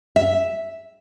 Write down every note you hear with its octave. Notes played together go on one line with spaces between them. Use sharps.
E5